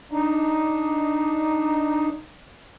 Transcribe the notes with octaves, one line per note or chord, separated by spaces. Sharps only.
D4 D#4